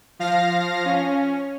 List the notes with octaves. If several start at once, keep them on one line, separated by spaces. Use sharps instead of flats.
F3 F5 A#6
C#4